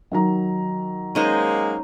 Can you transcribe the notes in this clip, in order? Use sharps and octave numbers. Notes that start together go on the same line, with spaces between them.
D#3 F#3 A#5
G#3 A#3 C#4 D#4 C5